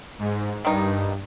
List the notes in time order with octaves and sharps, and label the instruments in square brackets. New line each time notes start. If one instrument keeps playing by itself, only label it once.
[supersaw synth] G#2
[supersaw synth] G2 [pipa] D#3 D#4